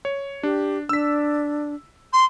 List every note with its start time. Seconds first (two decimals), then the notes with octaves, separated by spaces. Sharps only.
0.05 C#5
0.43 D4 G4
0.89 D4 E6 B6
2.13 C6